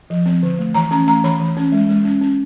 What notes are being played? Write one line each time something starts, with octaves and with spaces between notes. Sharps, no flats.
F3
C4
D3
A3
E3 A#5
C#4 A#5
A3 A#5
E3 B5
E3
C#4
G#3
G#3
C#4
C#4